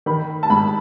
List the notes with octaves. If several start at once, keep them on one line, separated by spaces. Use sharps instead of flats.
D#3 B5
A5
G#2 B5